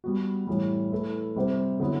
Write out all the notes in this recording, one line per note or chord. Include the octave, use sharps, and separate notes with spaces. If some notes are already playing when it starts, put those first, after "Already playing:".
G3 B3 F#4
A2 E3 G3
A3 E4 B4
C3 G3 C4 G4 C5
D3 F#3 B3 E4